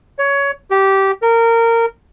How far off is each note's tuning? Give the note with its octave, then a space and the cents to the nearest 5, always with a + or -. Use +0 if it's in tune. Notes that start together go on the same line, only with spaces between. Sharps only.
C#5 +15
G4 -15
A#4 -20